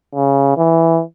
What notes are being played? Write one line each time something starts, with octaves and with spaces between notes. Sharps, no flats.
C#3
E3